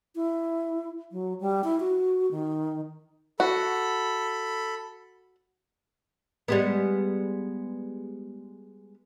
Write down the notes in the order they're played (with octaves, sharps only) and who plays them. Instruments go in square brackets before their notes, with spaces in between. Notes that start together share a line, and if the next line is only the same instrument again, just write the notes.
[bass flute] E4
F#3
G3
E4
F#4
D#3
[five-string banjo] F#4 [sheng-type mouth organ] A4 B5
[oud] G3 G#3 B3